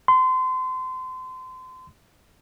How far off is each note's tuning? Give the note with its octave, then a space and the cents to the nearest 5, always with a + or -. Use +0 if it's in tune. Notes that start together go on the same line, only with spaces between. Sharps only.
C6 -30